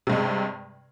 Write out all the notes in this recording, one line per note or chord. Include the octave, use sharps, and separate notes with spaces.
G2 C3 G#3